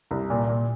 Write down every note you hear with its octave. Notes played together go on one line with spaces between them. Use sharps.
C2
A#2
A#2